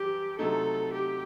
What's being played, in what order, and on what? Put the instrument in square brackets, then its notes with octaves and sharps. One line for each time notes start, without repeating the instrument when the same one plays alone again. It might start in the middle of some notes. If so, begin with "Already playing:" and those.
Already playing: [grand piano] F#2 E3 G3 [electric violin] G4
[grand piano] C3 F#3 A3 D#4 [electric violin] A4
[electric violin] G4